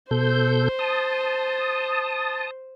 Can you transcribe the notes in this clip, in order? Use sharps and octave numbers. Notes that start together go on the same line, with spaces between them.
B2 A4 C5 G6
A5 D#6